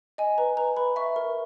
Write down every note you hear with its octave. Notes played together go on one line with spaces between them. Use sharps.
D#5 G#5
B4 A#5
B4 A#5
B4 B5
E5 C#6
A#4